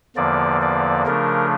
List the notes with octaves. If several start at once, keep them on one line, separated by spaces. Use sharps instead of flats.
E2 D3 F3 A#3 D5
D5
C#3 F3 A3 D4 A#4